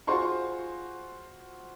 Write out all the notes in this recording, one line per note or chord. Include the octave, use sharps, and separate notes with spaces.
F4 F#4 G#4 C5 C6 C#6